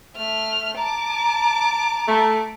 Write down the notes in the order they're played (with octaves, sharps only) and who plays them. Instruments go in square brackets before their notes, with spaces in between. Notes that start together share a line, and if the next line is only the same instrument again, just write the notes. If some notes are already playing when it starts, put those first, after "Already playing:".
[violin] A3 F6
[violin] A5 D6 [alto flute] A#5
[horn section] A3